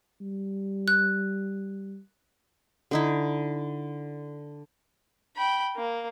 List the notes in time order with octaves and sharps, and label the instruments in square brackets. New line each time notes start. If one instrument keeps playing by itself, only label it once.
[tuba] G3
[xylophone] F#6
[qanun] D3 D#4 E4
[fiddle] G5 B5
A#3